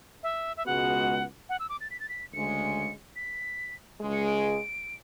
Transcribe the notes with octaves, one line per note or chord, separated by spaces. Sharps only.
E5
E5
C#2 B2 G#3 B3 F#4 F#5
F#5
E6
D6
A6
B6
A6
B6
D2 C#3 G#3 C#7
B6
C#2 C#3 G#3
C#7
D7